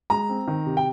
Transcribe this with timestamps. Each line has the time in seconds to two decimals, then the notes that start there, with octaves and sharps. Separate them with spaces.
0.10 G#3 A#5
0.29 C4
0.47 D#3
0.66 C3
0.77 G5